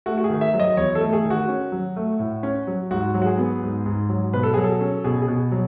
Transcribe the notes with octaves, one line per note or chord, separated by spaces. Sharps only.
A3 F#4
F#4
G#4
D#3
E5
F#3
D#5
E2 C#5
A4
A3
G#4
D#3
F#4
C#4
F#3
A3
A2
C#4
F#3
G#2 F#4
F#3
F#4
G#4
B3
G#2
G#2
F#3
B2 B4
A4
F#3 G#4
A4
C#4
B2 G#4
G#4
B2
F#3